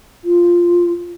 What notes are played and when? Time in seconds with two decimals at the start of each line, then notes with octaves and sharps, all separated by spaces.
0.24 F4